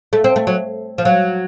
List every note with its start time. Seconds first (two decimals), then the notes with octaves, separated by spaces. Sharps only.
0.13 A3
0.24 C4
0.36 A3
0.47 F#3
0.98 F3
1.05 F#3